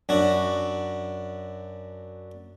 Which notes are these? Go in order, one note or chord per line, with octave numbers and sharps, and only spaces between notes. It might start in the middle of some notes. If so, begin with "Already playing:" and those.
F#2 D4 F#4